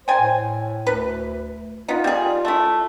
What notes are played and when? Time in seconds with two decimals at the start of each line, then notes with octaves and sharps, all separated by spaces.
0.08 C5 G5 G#5
0.21 A2
0.87 D2 B4
1.88 B3 D#4 F4
2.04 G3 G#4
2.45 A3 E4